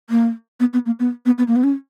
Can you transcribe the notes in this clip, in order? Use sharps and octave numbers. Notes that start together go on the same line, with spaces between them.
A#3
B3
B3
A#3
B3
B3
B3
A#3
B3
C#4